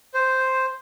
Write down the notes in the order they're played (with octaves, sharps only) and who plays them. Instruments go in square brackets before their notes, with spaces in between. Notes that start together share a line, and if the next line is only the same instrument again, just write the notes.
[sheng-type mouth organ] C5